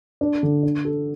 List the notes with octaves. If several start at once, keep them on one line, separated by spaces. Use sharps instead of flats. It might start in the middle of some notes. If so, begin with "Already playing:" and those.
D4
D3
D4
A4